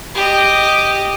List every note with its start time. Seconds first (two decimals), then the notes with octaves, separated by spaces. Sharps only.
0.15 G4 D#5